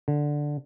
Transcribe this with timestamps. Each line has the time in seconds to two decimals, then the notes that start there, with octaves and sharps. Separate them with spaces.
0.08 D3